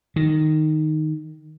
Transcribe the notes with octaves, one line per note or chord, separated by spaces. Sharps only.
D#3